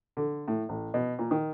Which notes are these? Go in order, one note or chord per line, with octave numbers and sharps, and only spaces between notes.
D3
A2
A1
B2
A#2
D#3